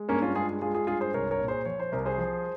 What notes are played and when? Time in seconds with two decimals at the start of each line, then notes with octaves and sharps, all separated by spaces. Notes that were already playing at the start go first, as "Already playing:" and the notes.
Already playing: G#3
0.09 G2 A#3 C#4
0.22 C#4 F4
0.36 G#3 F4 G#4
0.62 G#3 F4 G#4
0.75 F4 G#4
0.87 G2 F4 G#4
1.00 G#4 C5
1.13 C2 A#4 C#5
1.31 A#4 C#5
1.39 A#2
1.48 G#4 C5
1.65 F3 C#5
1.80 C5
1.92 C2 A#4
2.06 G#4 C5
2.18 F3